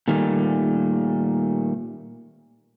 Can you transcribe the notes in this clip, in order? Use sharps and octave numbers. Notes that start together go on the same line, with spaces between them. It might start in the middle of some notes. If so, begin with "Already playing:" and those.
A#2 D#3 G3 A3